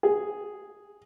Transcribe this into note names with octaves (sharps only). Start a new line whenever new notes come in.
G#4